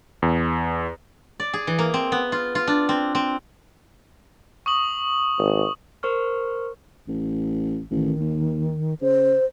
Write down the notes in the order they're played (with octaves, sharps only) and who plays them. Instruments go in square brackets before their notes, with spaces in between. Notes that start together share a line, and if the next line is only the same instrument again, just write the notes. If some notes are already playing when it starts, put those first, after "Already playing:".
[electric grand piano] E2
[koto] D5
G#4
E3
A#3
C4
B3
F4
F4
D4
C4
C4
[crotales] C#6 D#6 F#7
[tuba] G#1
[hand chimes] A#4 C5 C#6 F6
[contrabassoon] A1
[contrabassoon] A1 [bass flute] D#3
[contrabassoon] D#2
[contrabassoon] C#3 [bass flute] C5